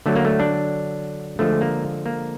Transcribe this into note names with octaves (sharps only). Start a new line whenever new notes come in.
D3 F#3 A3
A#3
A3
D4
D3 F3 G#3 A3
A#3
A#3